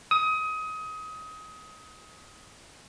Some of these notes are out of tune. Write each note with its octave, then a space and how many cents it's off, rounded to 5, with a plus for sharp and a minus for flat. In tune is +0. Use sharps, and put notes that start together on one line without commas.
D#6 +25